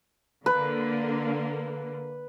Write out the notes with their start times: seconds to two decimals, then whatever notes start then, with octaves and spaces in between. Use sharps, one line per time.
0.46 D3 A#3 B4